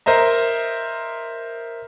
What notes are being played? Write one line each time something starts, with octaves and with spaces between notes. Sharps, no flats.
A#4 C5 D#5 E5 A#5